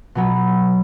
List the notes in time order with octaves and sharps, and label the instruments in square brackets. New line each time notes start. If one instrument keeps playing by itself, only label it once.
[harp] B2 F#3 B3